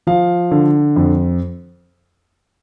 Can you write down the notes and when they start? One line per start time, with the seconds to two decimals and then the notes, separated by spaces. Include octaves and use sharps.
0.07 F3 F5
0.51 D3
0.96 F2